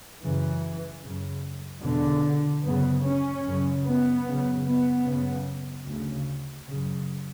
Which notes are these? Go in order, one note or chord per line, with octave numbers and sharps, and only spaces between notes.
F#2 C#3 E3
F#2 C#3
E2 B2 D3
F#2 C#3 B3
C#4
F#2 C#3
B3
F#2 C#3
B3
F#2 C#3
D2 C#3
F#2 C#3